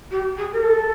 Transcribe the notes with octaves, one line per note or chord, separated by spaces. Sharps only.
G4
G#4
A#4
A4